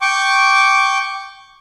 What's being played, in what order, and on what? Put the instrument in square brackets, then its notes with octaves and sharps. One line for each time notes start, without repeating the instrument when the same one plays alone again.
[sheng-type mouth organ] G5 C#6 D6